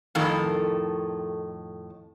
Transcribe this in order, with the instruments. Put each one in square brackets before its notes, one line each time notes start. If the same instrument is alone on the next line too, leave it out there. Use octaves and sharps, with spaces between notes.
[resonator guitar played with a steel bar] F2 A2 D#3 A4 A#4